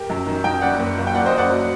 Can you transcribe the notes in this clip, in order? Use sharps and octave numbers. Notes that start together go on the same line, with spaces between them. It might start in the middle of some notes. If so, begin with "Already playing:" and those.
Already playing: G4 A#4
F#2
D#3
F#2 D#5 G5
F#1 D5 F#5
F#1
F#1
G5
F#1 D5 F#5
C5 D#5
F#1
D5 F#5
F#3